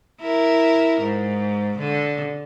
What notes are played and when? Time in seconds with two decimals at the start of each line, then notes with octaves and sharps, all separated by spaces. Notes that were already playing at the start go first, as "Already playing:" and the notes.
0.20 E4 A#4
1.00 G#2
1.78 D3